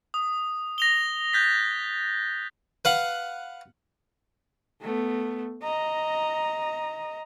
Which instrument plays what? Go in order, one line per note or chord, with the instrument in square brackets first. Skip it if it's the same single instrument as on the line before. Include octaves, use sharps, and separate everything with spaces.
[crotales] D#6
A#6 F7 G7
F#6 G6 A6 B6
[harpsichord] B4 F5 F#5
[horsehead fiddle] A3 B3
D#5 A#5